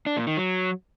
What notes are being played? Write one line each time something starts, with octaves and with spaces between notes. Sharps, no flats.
D4
A#2
D#3
F#3